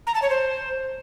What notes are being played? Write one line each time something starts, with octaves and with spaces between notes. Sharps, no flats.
A#5
A5
C#5
C5